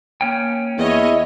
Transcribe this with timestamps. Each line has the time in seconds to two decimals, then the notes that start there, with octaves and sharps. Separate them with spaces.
0.21 A#3 C#4 G5
0.78 E2 E4 C#5 D#5